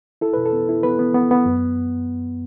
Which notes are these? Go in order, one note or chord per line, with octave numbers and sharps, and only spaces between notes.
E4 A4
B2 B4
A4
B3
E4
B3 B4
B3
B3
B3
F#2